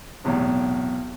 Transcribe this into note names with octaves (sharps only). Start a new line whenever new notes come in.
B1 E2 A2 C3